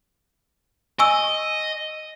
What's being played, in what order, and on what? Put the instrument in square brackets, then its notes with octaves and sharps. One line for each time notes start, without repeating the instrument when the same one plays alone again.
[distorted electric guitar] D#5 [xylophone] G#5 C#6 E6